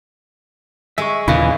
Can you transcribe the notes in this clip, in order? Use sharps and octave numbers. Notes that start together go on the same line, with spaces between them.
G#3 E5 C#6
D#2 A#2 C#3 E3 E4 B4 G#5